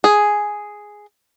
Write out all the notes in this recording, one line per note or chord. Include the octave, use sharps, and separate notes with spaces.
G#4